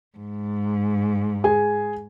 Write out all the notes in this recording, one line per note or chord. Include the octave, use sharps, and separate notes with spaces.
G#2
G#4 G#5